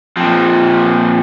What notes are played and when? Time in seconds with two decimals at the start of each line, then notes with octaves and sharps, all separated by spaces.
0.17 A#2 F3 C4